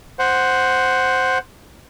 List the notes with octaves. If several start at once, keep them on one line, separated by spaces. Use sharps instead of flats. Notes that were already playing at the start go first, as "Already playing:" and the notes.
C5 F#5